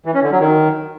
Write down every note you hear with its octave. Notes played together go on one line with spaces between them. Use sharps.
E3
C#4
D3
F#3
D#3